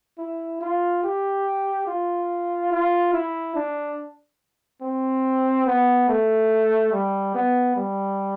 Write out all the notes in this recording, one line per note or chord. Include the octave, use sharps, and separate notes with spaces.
E4
F4
G4
F4
F4
E4
D4
C4
B3
A3
G3
B3
G3